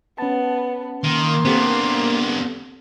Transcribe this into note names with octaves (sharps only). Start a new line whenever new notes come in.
B3 C#4 A5
D#3 A#3 C6
B3 C4 D4 G4 A4